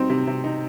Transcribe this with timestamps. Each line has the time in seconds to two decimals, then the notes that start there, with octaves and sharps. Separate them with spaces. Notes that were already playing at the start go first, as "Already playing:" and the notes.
Already playing: G3 C4 D#4
0.10 C3
0.27 C3
0.44 D#4